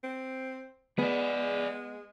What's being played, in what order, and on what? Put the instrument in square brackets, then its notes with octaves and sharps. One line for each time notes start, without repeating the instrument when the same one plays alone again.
[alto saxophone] C4
[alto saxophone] G#3 [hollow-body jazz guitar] B3 [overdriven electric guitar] G#4 D5